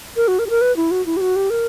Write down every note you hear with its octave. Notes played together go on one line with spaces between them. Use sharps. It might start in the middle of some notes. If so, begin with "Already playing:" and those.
A#4
F#4
A#4
G4
A#4
B4
E4
F#4
E4
G4
F#4
G4
A#4